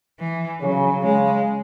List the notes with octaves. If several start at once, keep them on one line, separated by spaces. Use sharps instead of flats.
E3
C#3 F#3
C#3 G#3